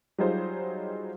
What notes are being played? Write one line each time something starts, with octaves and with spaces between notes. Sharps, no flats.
F#3 G3 D#4 F4 G#4 C5